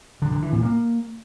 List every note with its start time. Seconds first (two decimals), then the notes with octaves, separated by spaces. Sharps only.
0.22 D3
0.32 D3
0.42 E3
0.52 A#2
0.63 A#3